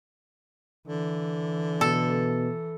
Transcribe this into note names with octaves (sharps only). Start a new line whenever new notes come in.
D3 E3
B2 A4